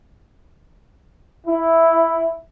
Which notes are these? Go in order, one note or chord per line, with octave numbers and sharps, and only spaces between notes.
E4